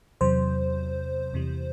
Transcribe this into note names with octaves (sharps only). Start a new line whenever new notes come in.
E2 C3 F#3 C5
E2 C3 E3 G3